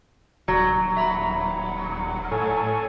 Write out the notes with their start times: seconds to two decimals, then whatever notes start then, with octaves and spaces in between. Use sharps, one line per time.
0.48 D#1 F#3
0.97 E5 A#5 B5
2.31 A2 A4 C#5 G#5